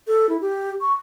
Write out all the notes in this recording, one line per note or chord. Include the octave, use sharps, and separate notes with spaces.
A4
E4
G4
C#6